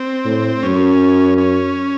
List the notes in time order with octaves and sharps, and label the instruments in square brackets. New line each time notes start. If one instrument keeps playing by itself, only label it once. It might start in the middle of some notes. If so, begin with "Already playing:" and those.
Already playing: [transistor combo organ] C4
[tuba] A2
[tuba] F#2 [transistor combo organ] C#4
[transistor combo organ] C#4